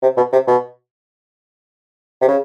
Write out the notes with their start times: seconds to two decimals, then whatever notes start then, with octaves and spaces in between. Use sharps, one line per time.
0.02 C3
0.17 B2
0.33 C3
0.47 B2
2.21 C3
2.28 C#3